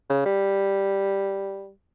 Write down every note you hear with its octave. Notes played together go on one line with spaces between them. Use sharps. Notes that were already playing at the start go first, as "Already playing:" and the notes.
C#3
G3